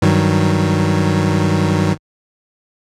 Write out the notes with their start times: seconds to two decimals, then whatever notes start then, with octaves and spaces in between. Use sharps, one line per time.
0.02 G2 D#3 F#3